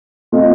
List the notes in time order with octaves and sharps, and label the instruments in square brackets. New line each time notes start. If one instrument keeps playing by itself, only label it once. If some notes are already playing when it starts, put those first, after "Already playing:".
[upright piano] A3 C4 F4 A4 D#5